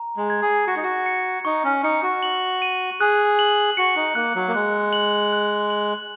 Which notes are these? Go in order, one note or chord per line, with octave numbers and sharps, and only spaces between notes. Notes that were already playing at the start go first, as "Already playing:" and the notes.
Already playing: A#5
G#3
G#6
G#4
F#4 C#7
D#4
F#4
C#7
D#4 C#6
C#4
D#4 C#7
F#4
F#7
D#7
G#4 F#6
F#7
F#4 C#7
D#4
A#3 F#6
F#3
A#3
G#3 F#6
F#7
F#6
F#7